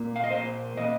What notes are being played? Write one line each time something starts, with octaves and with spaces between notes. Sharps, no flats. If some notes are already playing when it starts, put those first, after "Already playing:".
Already playing: A#2 A#3
F5
D#5
A#2 A#3 C5
A#2 A#3 D#5